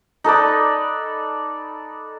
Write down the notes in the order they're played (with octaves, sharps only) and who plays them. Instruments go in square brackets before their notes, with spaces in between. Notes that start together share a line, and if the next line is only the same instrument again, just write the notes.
[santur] D#4 A4 B4 D5